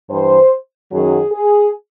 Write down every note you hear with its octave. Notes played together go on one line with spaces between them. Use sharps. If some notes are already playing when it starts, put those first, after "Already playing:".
G2 E3 C5
F#2 D#3 F#3 G#4
G#4